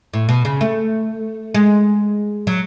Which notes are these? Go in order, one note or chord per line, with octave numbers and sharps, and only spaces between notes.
A2
B2
C#3
A3
G#3
F#3